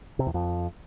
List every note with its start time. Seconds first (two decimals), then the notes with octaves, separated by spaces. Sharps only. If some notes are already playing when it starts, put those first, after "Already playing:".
0.19 C3
0.27 E2
0.34 F2